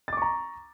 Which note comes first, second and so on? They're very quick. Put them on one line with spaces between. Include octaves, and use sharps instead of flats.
A6 D6 C#6 A#5